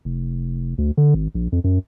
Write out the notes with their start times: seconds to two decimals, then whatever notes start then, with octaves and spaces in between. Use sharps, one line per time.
0.05 F1
0.78 D2
0.97 D3
1.14 G#1
1.35 A#1
1.52 F2
1.64 F#2